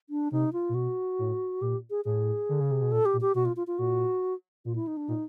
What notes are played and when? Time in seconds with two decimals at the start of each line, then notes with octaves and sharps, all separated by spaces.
0.10 D4
0.31 C3 D#4
0.53 F4
0.69 A#2
0.74 B2 F#4
1.19 A2
1.61 A#2 G4
1.90 G#4
2.05 A2 G#4
2.49 D3
2.60 C#3
2.71 C3
2.81 B2
2.92 A#2 A4
3.05 G4
3.13 A#2
3.21 G4
3.35 B2 F#4
3.45 F4
3.57 F4
3.67 F4
3.79 A#2 F#4
4.65 A#2 F4
4.75 E4
4.87 D#4
4.97 D4
5.08 A#2 D#4